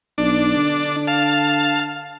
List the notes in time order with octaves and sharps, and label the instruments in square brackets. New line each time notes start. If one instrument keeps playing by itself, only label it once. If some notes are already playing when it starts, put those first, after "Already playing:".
[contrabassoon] B1 [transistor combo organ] D4
[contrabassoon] D3
[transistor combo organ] F5 A5